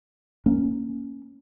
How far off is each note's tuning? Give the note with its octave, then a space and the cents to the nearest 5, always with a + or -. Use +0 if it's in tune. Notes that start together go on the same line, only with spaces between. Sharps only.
A#3 +0 C#4 +0